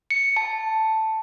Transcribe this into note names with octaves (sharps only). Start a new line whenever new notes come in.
C#7
A5